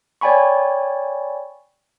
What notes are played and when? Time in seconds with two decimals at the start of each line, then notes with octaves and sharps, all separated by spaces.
0.21 C#5 D5 G5 G#5 B5 C#6